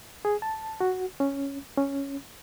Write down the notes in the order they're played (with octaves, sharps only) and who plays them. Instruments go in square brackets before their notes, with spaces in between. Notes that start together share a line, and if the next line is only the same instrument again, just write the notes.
[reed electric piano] G#4
A5
F#4
C#4
C#4